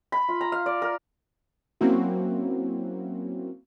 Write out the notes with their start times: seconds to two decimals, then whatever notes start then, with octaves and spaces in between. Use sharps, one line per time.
0.12 B5
0.29 F4
0.41 A#5
0.52 F5
0.66 D5
0.82 A#4
1.81 F#3 A#3 C4 C#4 E4 F#4